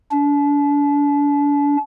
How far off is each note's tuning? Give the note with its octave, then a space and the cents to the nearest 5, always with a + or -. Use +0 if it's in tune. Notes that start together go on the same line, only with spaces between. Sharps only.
D4 -35